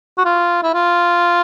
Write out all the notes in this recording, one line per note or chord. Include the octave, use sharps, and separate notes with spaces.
F#4
F4
E4
F4